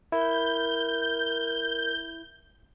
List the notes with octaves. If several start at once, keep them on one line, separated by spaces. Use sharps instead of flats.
E4 A#4 G6